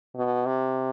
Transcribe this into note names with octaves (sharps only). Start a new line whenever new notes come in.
B2
C3